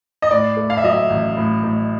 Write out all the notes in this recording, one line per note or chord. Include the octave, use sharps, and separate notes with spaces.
D#5
A2 D5
A3
F5
E5
F#3 D#5
E5
A1
A2
A2